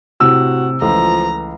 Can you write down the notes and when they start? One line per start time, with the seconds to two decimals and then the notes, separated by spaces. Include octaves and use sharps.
0.20 A2 C3 F#4 E6
0.81 C#2 E3 F3 A3 A#5